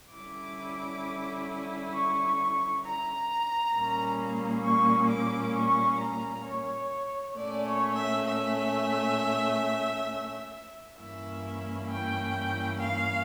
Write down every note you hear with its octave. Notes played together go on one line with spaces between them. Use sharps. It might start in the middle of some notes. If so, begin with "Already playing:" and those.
D3 G3 C#4 E4 D6
C#6
A#5
A#2 G3 A#3 C#4
C#6
D6
C#6
A#5
C#5
A#2 A3 C#4 D5
C#5
E5
E5
G2 E3 A#3 C#4 E4 E5
G5
F5